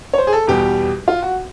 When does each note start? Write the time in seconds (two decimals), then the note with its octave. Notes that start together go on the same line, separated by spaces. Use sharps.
0.13 C#5
0.18 C5
0.27 G#4
0.33 A4
0.47 E2 B2 G3 G4
1.08 F4
1.22 F#4